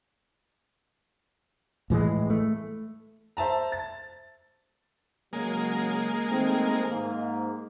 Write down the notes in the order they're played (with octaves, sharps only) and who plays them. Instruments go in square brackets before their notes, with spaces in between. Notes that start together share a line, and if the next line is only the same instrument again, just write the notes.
[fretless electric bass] A2 E3 F3 G#3
A3
[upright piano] C5 E5 A5 A#5
A6
[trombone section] C#3 F#3 [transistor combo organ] G#3 A#3
[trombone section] D#3 A3 C4
G#2 A#3